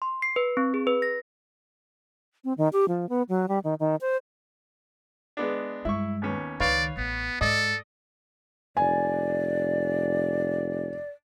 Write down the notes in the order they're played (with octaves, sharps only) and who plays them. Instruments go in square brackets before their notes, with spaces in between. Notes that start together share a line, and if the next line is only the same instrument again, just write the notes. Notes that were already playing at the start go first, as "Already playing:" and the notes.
[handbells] C6
C7
B4
C4
G#4
B4
A#6
[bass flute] C4
D#3
G4
F3
B3
F#3
G3
D#3
D#3
C5
[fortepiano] G#3 B3 D4
[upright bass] G2 G#3 [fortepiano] E4 C#6
[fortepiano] D#2 B3 C#4
[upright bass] C#2 D#3 [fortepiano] B4 C#5 F5 [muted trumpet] D5
[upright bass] A1 [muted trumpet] B3
[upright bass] G#2 [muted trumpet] A4 [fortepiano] D5 D#5
[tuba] F1 [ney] D5 [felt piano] G#5